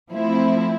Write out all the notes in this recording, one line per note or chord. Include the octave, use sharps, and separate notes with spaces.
F3 A3 C4 E4